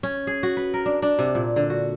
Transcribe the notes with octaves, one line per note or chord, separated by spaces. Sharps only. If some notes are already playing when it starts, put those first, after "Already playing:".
C#4
G#4
F#4
B4
A#4
D4
D4
C3
A#2
D3
F#4